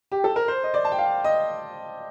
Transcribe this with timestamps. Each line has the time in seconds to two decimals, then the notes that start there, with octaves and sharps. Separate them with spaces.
0.12 G4
0.24 A4
0.36 A#4
0.48 C5
0.64 D#5
0.74 D5
0.85 A5
0.92 G5
0.99 F5
1.24 D#5